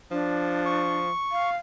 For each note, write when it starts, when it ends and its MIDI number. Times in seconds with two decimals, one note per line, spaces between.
0.11 1.11 53
0.11 0.97 62
0.65 1.50 85
1.32 1.57 77